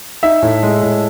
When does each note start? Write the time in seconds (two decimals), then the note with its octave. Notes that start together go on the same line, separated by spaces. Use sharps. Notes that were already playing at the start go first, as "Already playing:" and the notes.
0.23 D#4 E5
0.42 A2
0.63 G#3
0.83 A2